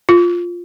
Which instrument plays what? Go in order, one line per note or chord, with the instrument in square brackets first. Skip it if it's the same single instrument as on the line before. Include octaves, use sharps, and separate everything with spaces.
[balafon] F4